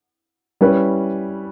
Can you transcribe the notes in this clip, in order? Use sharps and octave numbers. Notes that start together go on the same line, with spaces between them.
G3 C#4 E4 B4